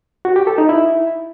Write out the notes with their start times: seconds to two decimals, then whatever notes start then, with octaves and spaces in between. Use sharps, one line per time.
0.25 F#4
0.36 G4
0.47 A4
0.58 D#4
0.69 E4